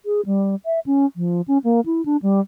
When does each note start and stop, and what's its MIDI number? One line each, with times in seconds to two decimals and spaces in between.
0.06 0.21 68
0.26 0.55 55
0.66 0.80 76
0.86 1.06 61
1.16 1.41 53
1.48 1.58 61
1.64 1.80 58
1.86 2.04 64
2.05 2.17 62
2.22 2.40 55